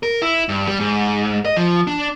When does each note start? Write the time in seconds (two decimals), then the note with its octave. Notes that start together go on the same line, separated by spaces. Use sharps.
0.03 A#4
0.22 E4
0.49 G2
0.68 G3
0.80 G#2
1.45 D#5
1.57 F3
1.87 D4